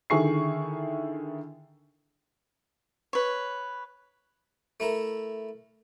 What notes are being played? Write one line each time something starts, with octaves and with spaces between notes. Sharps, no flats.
D3 D#3 E4 G#4 C#6 C7
B4 C#5
A3 E4 A#4